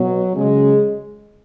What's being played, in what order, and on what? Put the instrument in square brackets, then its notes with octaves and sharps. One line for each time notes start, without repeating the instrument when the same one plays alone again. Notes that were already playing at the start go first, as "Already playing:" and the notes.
Already playing: [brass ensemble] B2 F#3
C#3 F#3 G#3